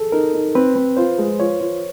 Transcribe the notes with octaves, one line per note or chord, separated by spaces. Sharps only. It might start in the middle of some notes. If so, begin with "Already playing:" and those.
Already playing: G#4 A4
D#4 A#4
D#4
C4 B4
C4
F4 C5
G#3
F4 C#5
F4